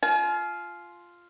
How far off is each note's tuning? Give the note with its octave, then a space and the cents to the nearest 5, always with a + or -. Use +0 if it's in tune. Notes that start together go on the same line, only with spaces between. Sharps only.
F4 +0 G#5 +40